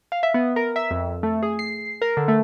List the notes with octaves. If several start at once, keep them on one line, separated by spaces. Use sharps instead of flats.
F5
E5
B3
A#4
E5
F2
A3
G#4
C7
A#4
D3
A3